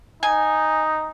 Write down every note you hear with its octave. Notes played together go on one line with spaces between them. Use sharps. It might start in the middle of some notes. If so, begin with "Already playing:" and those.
D#4 G#5